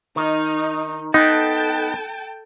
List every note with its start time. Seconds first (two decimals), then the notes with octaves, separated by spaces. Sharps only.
0.16 D#3 D#4
1.14 B3 D#4 A4 G5 A5